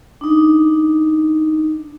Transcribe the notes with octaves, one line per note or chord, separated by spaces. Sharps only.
D4 D#4